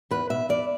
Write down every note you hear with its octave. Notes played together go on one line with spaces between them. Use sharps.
E2 B4
B2 E5
E2 D5